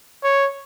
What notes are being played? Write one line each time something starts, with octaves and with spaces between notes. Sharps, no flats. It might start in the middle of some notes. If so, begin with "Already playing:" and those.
C#5